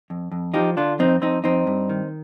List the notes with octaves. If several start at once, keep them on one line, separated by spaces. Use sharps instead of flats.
F2
F2
F3 D#4 G4
D3 D4 F4
F2 C4 D#4
F2 C4 D#4
F2 C4 D#4
G2
D#3